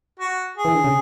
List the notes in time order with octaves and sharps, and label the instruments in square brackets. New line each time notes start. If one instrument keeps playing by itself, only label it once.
[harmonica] F#4
G#4
[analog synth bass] E3
D3
C#3